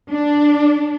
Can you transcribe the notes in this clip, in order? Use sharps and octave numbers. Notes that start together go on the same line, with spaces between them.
D4